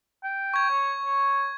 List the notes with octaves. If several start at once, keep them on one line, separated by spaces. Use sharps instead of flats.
G5
C#6 G#6
C#5
C#5